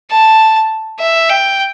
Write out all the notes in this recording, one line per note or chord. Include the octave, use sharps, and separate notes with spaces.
A5
E5
G5